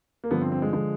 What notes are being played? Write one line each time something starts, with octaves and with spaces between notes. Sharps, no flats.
A#3
G2 D3 F3 B3
C4
C4
G#3
D3 F3 G#3